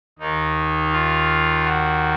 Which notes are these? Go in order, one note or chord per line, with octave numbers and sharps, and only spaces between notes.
D#2 D#3 D#4
F4
F#4